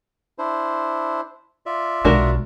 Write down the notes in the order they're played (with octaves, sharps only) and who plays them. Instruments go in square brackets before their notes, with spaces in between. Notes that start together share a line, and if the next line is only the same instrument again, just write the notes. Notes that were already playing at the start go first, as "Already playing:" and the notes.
[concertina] D4 E4 C5
F4 D5 E5
[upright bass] B1 G#3 [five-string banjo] D4 F#4 A#4